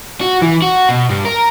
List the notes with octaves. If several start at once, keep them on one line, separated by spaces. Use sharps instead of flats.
F#4
E3
F#4
B2
G2
A#4